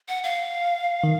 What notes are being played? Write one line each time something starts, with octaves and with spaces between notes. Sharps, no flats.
F#5
F5
D#3